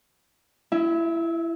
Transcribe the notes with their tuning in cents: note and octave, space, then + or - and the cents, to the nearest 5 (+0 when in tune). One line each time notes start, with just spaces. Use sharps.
E4 +20 E5 -25